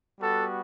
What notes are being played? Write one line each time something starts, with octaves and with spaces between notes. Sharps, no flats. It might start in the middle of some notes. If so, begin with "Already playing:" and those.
G3 B3 F#4 A4